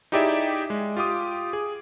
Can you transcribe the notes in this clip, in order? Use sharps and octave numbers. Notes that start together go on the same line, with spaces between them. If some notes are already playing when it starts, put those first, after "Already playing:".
D#4 E4 G4 G#4 D5 E5
G#3
F4 G4 D6 D#6
G#4